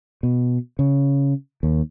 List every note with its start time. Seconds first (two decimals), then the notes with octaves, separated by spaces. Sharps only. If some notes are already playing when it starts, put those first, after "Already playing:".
0.23 B2
0.79 C#3
1.63 D#2